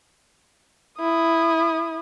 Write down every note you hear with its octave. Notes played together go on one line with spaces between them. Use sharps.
E4 D#6